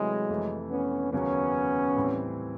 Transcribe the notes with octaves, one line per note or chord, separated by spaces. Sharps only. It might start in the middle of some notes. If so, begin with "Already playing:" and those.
Already playing: C3 E3 F#3 G#3 A3 C4 E4
F2 C3 E3 A3
B3 C#4
D#2 C#3 F#3 B3 C#4
A2 E3 G3 C4